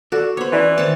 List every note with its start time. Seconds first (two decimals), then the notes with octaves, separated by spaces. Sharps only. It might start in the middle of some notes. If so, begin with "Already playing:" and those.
0.12 F#4 A4 D5
0.37 B3 C5 C#5 B5 D6
0.52 E3 C#4 B4 D5 F5 C6
0.78 D#3 C4 C#5 A5